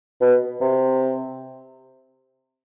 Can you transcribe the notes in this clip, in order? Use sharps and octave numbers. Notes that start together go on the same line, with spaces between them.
B2
C3